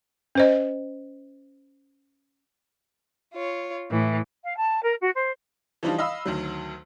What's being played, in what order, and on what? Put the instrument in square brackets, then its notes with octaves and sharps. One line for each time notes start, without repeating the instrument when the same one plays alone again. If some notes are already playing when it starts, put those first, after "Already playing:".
[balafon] C#4 C5 D#5
[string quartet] F4 C#5
A2 E3
[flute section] F5
A5
A#4
F#4
C5
[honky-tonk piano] E3 F3 G3 D4 D#4 F4
D#5 F5 B5 E6
D2 D#3 F#3